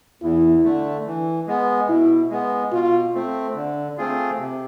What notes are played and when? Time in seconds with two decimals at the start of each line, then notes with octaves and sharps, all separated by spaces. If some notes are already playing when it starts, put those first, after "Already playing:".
0.22 E2 E4
0.64 D3 A3
1.06 E3
1.47 G#3 B3
1.89 B2 E4
2.30 G#3 B3
2.72 B2 F4
3.14 A3 C4
3.55 D3
3.98 A3 C4 F4 G#4
4.39 C3